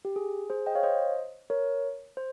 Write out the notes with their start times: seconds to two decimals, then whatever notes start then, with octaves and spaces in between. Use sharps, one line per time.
0.05 G4
0.16 G#4
0.50 G#4 C5
0.66 D#5 G5
0.75 C#5 F5
0.83 C5 D#5
1.50 A#4 C#5
2.17 C5